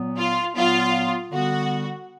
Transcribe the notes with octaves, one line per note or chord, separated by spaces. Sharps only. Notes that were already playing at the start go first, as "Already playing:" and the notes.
Already playing: A#2 F#3 B3
F4
A#2 F#3 B3 F4
D3 G3 B3 F#4